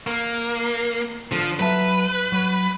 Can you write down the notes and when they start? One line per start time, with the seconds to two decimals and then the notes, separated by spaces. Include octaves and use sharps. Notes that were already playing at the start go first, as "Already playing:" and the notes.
0.07 A#3
1.32 D3 F3
1.59 F#3 B4 E5 A5
2.32 F#3